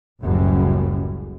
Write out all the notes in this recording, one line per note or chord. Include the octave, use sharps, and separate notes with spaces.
F#1 C#2 F#2 A2 C#3 G3